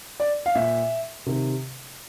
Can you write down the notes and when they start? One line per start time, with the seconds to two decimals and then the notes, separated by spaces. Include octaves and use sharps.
0.20 D5
0.46 F5
0.55 A#2 E5
1.26 C3 D#3